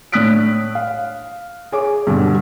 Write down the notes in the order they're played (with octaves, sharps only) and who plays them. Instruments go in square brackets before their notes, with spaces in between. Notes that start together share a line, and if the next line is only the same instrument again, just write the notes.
[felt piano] A2 D4 D#6 F#6 B6 D7
F5
G#4 C#5 G#5 D6
G2 B2 D3 G3 B3